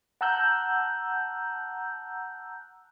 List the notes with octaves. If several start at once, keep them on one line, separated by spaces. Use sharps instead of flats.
F#5 A5 A#5 E6 F#6 G6